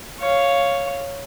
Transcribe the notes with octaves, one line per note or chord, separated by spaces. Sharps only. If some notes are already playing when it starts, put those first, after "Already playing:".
C#5 F5